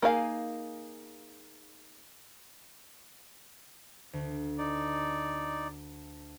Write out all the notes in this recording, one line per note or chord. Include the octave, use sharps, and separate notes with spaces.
A#3 D#4 G#4 F5 G#5
D2
D#4 D5